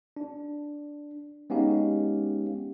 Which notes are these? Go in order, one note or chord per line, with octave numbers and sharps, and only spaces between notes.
D4
G#3 B3 C#4 D#4 G4 F5